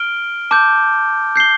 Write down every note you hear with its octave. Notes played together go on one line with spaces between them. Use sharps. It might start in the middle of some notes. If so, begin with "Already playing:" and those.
Already playing: F6 D7 G7
A5 D6 G6
G6 C7 G7